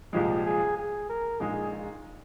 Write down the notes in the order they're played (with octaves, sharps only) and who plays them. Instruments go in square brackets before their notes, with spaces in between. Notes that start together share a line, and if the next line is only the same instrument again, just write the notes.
[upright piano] C2 A#2 F3 G#3 [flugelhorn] G4
[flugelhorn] G#4
G#4
A#4
[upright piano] A#1 A#2 G#3 D#4 [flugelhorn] G#4